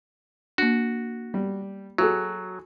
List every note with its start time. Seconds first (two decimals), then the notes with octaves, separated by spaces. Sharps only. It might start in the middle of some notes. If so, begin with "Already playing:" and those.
0.58 A#3 D4 F#4
1.34 G3
1.98 F#3 F#4 G#4 A4